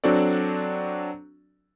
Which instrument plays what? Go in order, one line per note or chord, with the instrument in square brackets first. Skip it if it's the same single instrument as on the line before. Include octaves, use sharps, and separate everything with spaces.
[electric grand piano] F#3 C4 D4 F#4 A4 D5